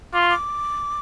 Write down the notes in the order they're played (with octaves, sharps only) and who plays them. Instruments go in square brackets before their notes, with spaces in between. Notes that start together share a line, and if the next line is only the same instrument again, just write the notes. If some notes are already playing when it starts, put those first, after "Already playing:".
[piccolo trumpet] F4 [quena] D6
[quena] C#6
D6